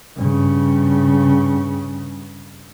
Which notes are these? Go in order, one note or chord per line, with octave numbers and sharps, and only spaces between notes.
G2 C#3